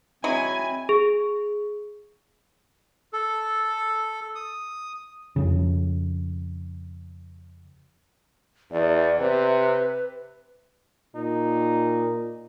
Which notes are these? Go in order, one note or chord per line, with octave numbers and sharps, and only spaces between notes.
F#3 G#3 C4 E4 G#5 B5
G#4
A4
D#6
F2 C#3
E2 D5
C3 B4
A#2 D#4